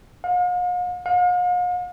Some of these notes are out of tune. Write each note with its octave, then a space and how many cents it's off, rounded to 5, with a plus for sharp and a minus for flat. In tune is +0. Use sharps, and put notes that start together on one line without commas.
F5 +45
F5 +45